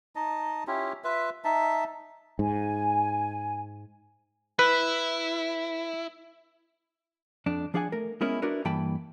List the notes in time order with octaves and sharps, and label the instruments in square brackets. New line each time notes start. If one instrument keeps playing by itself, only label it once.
[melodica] D#4 D#5 A5
C#4 E4 F4 G4
F4 B4 E5
D#4 E5 A5
[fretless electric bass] G#2 [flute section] G#5
[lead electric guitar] E4 [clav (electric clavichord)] B4
[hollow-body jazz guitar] F2 D4
F3 D4 G#4 D5 F#5 G#5
A3 A#4
G#3 B3 C#4 E4 A#4 D#5
D4 E4 F#4 A#4 B4
G2 E3 A#3 G5 A5 B5